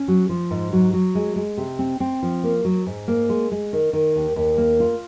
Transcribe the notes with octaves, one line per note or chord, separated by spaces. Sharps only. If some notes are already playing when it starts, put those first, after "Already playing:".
Already playing: C#4
F#3
F3
G#2
F#3
F#3
G#3
G#3
C3
C4
C4
F3
A#3
F#3
G#2
A#3
G#3
G#3
D#3
D#3
D#2
D#2
A#3
F4